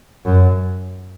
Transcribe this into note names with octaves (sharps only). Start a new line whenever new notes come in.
F#2